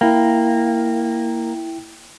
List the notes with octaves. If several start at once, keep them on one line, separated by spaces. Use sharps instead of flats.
A#3 E4 G5